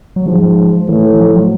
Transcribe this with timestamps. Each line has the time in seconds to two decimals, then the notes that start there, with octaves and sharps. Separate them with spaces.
0.16 F#3
0.26 G#2 F3
0.88 A2 E3
1.20 F3
1.35 F#3